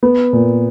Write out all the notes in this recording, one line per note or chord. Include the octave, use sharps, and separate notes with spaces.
B3
A#2